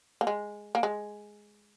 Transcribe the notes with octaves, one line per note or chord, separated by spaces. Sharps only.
A#3
G#3
A#3
G#3